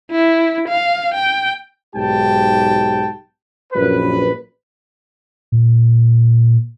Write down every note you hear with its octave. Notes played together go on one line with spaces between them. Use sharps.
E4
F5
G5
B1 G#2 G4 G5 A5
A#1 F#2 B4
A#2